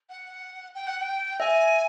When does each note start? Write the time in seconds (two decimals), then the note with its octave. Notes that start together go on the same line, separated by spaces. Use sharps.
0.10 F#5
0.75 G5
0.87 F#5
1.01 G5
1.40 E5 G#5